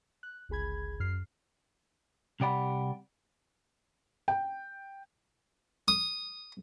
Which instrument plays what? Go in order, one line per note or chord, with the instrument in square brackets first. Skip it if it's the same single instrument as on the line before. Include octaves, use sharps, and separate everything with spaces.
[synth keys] F#6
G1 C#2 G#4 B5 G#6
F#2 F6 C7
[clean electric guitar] C2 C3 G4 D5 F#5 B5
[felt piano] G5
[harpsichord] D#6